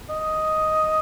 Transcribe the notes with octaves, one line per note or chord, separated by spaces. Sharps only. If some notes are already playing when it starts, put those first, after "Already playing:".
D#5